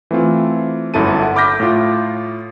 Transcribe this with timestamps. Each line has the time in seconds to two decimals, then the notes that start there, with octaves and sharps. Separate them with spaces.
0.11 E3 A3 C4 F4
0.94 G1 F#2 E4 A4 A5 D#7
1.23 F#5
1.36 B5 D6 F6 G6 A#6 B6
1.60 A2 F4